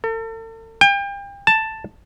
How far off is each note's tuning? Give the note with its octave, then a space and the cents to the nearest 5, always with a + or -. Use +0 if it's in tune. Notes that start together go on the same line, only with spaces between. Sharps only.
A4 +40
G5 +35
A5 +5